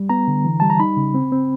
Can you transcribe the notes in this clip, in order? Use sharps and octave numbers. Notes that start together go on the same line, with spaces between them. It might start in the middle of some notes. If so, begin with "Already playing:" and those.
Already playing: G3
B3 A#5
D3
E3
G3 A5
A#5
D#4 B5
C#3
C4
C4